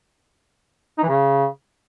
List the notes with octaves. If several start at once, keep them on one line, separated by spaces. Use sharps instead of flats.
D#4
E3
C#3